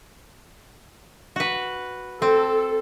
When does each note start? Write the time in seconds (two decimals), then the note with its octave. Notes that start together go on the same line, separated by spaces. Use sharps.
1.36 F#4 B4
2.22 C4 A4